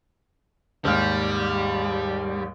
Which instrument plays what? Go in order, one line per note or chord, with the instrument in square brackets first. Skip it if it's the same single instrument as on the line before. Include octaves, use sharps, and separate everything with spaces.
[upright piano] D#2 G#2 F6 [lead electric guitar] G3